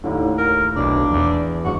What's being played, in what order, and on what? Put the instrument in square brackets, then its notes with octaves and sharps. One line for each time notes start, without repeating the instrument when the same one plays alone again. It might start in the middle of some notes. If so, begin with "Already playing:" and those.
[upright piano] D#2 A2 [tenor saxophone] D3
[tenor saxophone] A#4
[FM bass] B1 [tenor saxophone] D4
[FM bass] E2
[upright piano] G1 G#3 C#6 [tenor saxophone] F#4